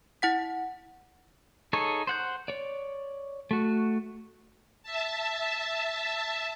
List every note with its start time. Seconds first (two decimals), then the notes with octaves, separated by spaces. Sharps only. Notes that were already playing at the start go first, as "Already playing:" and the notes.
0.22 E4 F#5 B6
1.73 D#4 G#4 A4 C#5
2.07 C5 F#5 G6
2.48 C#5 D5
3.51 A3 F#4
4.83 E5 A5